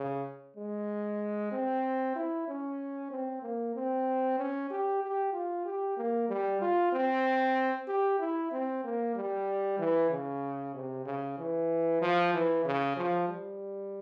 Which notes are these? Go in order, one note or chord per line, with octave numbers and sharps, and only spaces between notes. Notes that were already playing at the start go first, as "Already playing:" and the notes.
Already playing: C#3
G#3
C4
E4
C#4
C4
A#3
C4
C#4
G4
G4
F4
G4
A#3
G3
F4
C4
G4
E4
C4
A#3
G3
E3
C#3
C3
C#3
E3
F3
E3
C#3
F3
G3